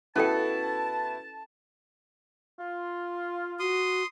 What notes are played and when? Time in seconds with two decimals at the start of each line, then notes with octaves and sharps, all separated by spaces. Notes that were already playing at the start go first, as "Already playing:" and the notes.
0.16 B2 C#4 E4 F#4 A4 G5 A5
2.59 F4
3.60 F#4 C6 D#6